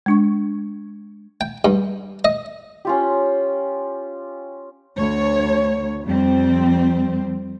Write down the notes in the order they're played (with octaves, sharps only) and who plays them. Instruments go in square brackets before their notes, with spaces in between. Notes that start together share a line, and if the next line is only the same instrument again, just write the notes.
[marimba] G#3 D4 C#6
[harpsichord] G5
G2
D#5
[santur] C#4 F4 G4
[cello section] D2 C#5
F2 G3 C4